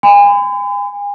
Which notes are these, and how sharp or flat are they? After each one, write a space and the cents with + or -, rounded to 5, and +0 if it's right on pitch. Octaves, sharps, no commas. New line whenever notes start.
G#5 -35 B5 +45